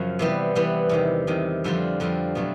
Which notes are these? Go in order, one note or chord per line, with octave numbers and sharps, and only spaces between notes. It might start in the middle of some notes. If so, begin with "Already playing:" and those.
Already playing: F#2 C#3 F3
C3 E3 G3 B3
C3 E3 G3 B3
E2 C3 D#3
E2 C3 D#3
F2 D3 G3 C4 F4
F2 D3 G3 C4 F4
B2 F#3 A3 C4